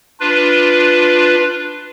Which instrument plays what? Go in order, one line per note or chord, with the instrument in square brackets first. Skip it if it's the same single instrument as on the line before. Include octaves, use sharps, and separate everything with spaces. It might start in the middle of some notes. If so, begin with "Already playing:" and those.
[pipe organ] D4 F4 B4